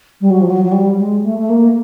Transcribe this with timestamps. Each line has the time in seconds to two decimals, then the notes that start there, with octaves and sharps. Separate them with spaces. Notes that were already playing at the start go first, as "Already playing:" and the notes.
0.21 G3
0.30 F#3
0.41 F3
0.50 F#3
0.65 F#3
0.72 G3
0.99 G#3
1.24 A3
1.38 A3
1.49 A#3